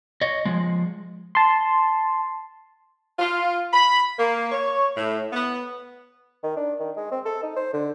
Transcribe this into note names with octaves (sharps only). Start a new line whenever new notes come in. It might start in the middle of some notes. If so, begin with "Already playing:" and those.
C#5 D#5
F3 G#3
A5 C6
F4
B5
A#3
C#5
A2
B3
D#3
D4
D#3
G#3
C4
A4
D#4
C5
D3